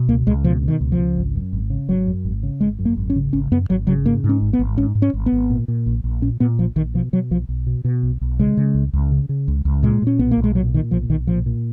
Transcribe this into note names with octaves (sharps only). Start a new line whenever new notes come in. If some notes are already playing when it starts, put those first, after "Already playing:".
Already playing: B2
C#2 A#3
C#2 G#3
B2 F3
B2
D#3
C#2
F3
C#2
G#1
F#2
G#1
C#3
G#1 F#3
F#2
G#1
C#3
G#1 G#3
F#2
A#3
G#1
C#4
C#3
G#1 C#4
F#2 B3
G#1 F#3
C#3 F#3
G#2 A#3
G#2
C#4
G#1
B3
G#1
G#2 C#4
G#2
C#4
G#1
B3
G#1
A#2
A#2
A#1
A#1
A#2 C#4
A#2 B3
A#1 F3
A#1 D#3
B2 F3
B2 F#3
B1 F3
B1
B2
B2
B1
B1
C#3 G#3
C#3
C#2
C#2
C#3
C#3
C#2
C#2
A#2 G#3
A#2 C#4
B1 B3
A#3
B1
G#3
A#2 F#3
A#2 D#3
B1 F3
B1 D#3
A#2 F3
A#2